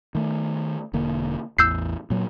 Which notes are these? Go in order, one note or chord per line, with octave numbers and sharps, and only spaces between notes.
D#3 A3
E1 D3 A#3
A1 E2 E6 G6 C7
A#2 F#3